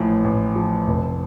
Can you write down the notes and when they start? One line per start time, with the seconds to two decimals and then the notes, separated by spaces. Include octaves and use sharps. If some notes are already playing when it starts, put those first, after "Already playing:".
Already playing: A1 A2 F3
0.24 A1
0.56 F3
0.87 F1